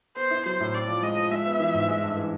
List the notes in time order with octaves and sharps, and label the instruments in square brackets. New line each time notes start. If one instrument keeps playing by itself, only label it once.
[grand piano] B3 [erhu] C5
[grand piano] E4
[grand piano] F#3 [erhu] C5
[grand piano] A2
[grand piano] C4 [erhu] D5
[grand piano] F3
[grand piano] G#3 [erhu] D#5
[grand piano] F3
[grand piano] G#3 [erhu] E5
[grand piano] B3
E3
G#2
G#3
G2
E3